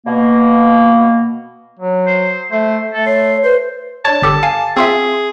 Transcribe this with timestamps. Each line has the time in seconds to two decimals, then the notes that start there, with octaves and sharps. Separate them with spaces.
0.06 B2 A#3
1.79 F#3
2.07 C5
2.52 A3 C5
2.94 A3 A4
3.06 C#5 C6
3.43 B4 C5 C6
4.05 D4 C#5 A5
4.22 G1 G4 A4
4.43 F5 G#5
4.77 C4 F4 G#4 E5